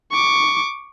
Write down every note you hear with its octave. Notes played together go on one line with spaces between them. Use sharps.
C#6 D6